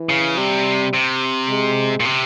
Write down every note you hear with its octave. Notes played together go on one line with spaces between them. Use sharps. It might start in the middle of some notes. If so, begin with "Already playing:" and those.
Already playing: E3
C#3
C3 G3
C3
G#3
A#2
C3